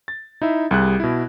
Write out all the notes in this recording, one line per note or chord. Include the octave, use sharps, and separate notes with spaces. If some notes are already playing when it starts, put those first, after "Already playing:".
A6
D#4 E4 E5
C2 G3 G#4 F#6
B2 E4